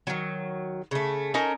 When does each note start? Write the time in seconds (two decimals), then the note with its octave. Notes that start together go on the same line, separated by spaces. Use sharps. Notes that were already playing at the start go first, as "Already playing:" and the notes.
0.07 D#3 F#3
0.91 C#3 A3
1.34 C#4 D#4 A4 A#4